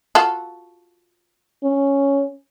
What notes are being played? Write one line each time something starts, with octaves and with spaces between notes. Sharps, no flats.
F4 F#4 A4
C#4